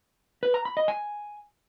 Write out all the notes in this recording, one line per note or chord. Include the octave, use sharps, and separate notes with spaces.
B4
A#5
B5
D#5
G#5